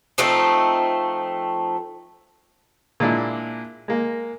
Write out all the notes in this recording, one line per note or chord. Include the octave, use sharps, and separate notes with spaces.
F3 A3 C4 D#4
A#2 G#3 A#3 D4 E4
G#3 A#3